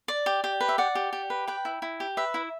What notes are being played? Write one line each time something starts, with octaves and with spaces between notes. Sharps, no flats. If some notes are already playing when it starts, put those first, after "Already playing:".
D5
G4
G4
B4
E5
D5 F#5
G4
G4
B4
B4 G5
E4
E4
G4
B4 E5
E4